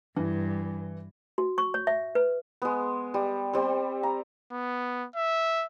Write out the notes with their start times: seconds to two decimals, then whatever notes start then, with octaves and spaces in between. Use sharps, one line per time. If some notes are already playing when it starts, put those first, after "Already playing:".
0.16 G2 E3
1.38 F#4
1.58 C#6
1.74 C#5
1.87 E5
2.15 B4
2.62 G#3 B3
3.14 G3
3.53 G3 C4
4.03 A#5
4.52 B3
5.16 E5